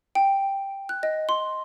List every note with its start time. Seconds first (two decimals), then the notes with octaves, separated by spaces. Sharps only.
0.15 G5
0.89 F#6
1.03 D#5
1.29 C6